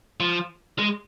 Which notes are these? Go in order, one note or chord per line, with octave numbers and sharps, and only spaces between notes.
F3
G#3